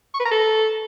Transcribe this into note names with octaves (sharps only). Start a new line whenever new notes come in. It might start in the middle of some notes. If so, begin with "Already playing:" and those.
C#6
B4
A#5
A4